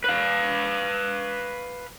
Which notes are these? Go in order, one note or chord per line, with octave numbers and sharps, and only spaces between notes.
B4 F5